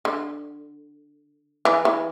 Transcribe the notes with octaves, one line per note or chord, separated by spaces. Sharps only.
D3
E3
E3